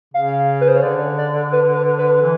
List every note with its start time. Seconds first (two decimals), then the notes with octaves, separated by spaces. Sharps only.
0.14 C#3 F5
0.61 B4
0.68 C5
0.76 C#5
0.83 D3 D5
1.18 D5
1.52 B4
1.75 B4
1.98 B4
2.22 E3